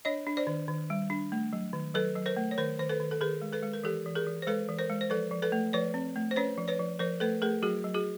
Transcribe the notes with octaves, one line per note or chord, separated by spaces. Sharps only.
D4 C#5 D#5
D4
C5 D5
D#3
D#3
G3
D4
A3
F#3
D#3
F#3 A4 B4
F#3
A#4 C5
A3
C#5
D#3 A#4 C5
D#3 C5
A4 B4
D#3
A4
D#3 G#4 A#4
G#3
A4 B4
G#3
A#4
E3 G4 A4
E3
G#4 A#4
E3
C5
G#3 A4 B4
E3
A#4 C5
G#3
C5
F3 A4 B4
F3
A4 B4
A3
F3 B4 C#5
C4
A3
C5
C#4 B4 C#5
F3
B4 C#5
F3
F3 A#4 C5
A3 A4 B4
A3 G#4 A#4
F#3 F#4 G#4
F#3
F#4 G#4